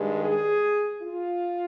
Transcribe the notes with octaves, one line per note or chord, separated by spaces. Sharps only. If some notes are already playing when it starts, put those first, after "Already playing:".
Already playing: G2 D#3 G#3
G#4
F4